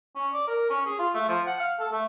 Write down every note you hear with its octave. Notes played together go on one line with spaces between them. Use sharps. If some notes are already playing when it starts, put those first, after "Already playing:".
C#4
D5
A#4
C#4
G#4
F4
A3
F3
F#5
F5
A4
A3